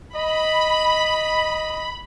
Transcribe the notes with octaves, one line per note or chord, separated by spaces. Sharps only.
D#5 B5